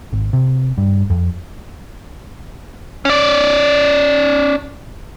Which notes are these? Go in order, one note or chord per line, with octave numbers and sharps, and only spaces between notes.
G#1
C3
G2
F2
C#4 D5